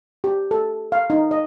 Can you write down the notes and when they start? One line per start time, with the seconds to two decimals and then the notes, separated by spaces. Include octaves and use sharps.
0.24 G4
0.51 A4
0.92 F5
1.10 D#4
1.31 D#5